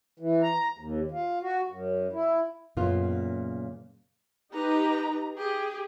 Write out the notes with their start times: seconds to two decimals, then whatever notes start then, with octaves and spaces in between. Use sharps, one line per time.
0.20 E3
0.43 A#5
0.78 D#2
1.11 F4
1.42 F#4
1.69 F#2
2.13 E4
2.77 F#2 A#2 C#3 A#3 B3 F4
4.53 D#4 G4 B4 A#5
5.38 G4 G#4